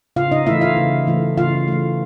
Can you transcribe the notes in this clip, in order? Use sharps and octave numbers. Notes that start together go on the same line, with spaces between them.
C#3 F4 F5
D#4 D#5
E3 A3 E4 E5
F4 F5
C#3
E3 A3
C#3 F4 F5
E3 A3